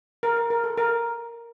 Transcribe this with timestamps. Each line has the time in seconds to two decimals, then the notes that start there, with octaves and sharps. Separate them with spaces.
0.23 A#4
0.36 A#4
0.50 A#4
0.64 A4
0.77 A#4